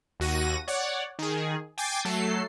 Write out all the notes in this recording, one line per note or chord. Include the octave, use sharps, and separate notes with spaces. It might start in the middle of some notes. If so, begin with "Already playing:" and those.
D#2 F#4 A#6 D#7
C#5 D5 F#5
D#3 G#4
G5 G#5 D6 A6 C7
F#3 A3 A4 C7